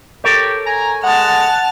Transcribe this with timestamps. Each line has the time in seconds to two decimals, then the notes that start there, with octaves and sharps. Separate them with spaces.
0.24 G4 A4 A#4 C#5
0.66 G#5 A#5
1.04 G#3 F#5 A5 F6